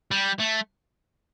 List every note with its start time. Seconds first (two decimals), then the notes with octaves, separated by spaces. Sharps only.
0.11 G3
0.40 A3